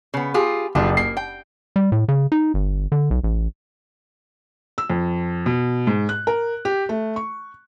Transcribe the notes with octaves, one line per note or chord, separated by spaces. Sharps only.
C#3 B3
F4 G4 G#4
F#1 G3 D4 F4
A#3 C7
G5
G3
A2
C#3
D#4
G1
D3
B1
A1
E6
F2
B2
G#2
F#6
A#4
G4
A3
C#6